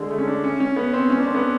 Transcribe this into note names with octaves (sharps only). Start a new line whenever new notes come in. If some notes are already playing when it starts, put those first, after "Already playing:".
Already playing: D3 G#3
A3
C#4
D4
C#4
C#4
B3
C4
C#4
D4
C4
B3